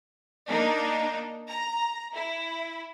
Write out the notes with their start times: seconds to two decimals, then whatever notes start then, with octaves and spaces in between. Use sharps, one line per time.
0.48 A#3 D4 D#4
1.49 A#5
2.13 E4